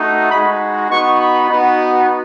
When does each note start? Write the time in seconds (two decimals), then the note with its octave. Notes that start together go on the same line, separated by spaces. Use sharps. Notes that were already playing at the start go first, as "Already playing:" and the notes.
Already playing: A3 D#4 F#4
0.29 G#3 D#4 F#4 B5
0.89 B3 D#4 F#4 C#6
1.18 B5
1.49 B3 D#4 F#4